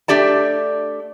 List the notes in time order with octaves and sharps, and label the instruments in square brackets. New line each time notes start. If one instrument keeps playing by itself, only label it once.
[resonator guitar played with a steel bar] A3 D4 G4 D5 A5